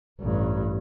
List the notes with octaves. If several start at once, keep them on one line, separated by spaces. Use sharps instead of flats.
A1 G2